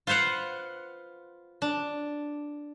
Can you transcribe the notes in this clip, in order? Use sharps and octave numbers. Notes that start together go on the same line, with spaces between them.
F4 B4 C5 F5 F#5
D4